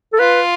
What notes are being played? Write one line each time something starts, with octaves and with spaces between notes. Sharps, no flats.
A4
F4 B4